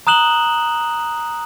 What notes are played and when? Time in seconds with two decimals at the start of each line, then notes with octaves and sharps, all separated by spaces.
0.07 A#5 D#6 F#6 E7 F#7 G7